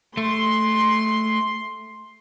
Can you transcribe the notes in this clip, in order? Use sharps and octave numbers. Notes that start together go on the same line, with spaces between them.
A3 C6